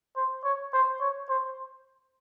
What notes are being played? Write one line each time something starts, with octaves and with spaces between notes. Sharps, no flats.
C5
C#5
C5
C#5
C5